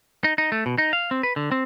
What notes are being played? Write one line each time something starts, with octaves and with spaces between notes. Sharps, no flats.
D#4
D#4
A3
B2
D#4
F5
C4
B4
D3
C4